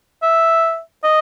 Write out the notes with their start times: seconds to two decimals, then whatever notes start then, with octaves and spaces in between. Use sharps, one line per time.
0.22 E5
1.04 D#5